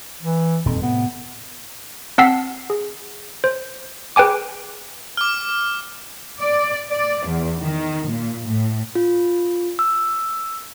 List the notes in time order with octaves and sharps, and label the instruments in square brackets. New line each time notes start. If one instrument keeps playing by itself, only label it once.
[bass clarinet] E3
[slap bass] D#1 A#2 D#3 [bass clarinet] F2
[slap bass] A2 C3 [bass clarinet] B3
[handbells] C4 F#5 A5 E6 B6 C7
G#4
C5
G#4 B4 G5 G#5 D6
[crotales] D6 F6
[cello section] D5
D5
E2
D#3
A#2
A2
[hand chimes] F4
E6